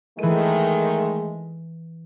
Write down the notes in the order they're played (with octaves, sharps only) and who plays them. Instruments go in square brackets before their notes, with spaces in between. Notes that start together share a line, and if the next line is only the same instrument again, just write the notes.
[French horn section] D#3 G#3 A3 [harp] E3 D#7